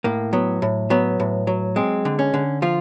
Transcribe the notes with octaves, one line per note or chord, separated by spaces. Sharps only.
A2 A#3
F#3 B3
A2
F#3 B3
A2
F#3
G#3 C4
D3
C#4
D3
F3 F4